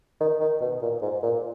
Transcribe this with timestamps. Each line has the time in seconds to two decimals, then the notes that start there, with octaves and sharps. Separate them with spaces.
0.21 D#3
0.40 D#3
0.61 B2
0.82 A#2
1.02 G#2
1.23 A#2